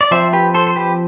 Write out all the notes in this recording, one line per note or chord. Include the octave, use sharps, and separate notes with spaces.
D5
F3 C4 C5 E5
G4 B4
A4 C5
C5
G4 B4